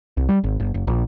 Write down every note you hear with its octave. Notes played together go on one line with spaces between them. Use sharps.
C2
G3
G#1
G1
F#1
A#1